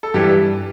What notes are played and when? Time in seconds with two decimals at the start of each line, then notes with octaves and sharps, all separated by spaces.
0.03 A4
0.14 G2 E3 G3 G4